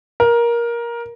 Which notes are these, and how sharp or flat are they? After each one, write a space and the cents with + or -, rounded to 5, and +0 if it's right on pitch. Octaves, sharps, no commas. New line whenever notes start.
A#4 +15